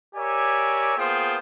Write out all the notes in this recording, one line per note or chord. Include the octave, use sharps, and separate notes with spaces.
G4 A#4 C#5 D5 E5 G#5
A#3 B3 F4 G#4 C5 G5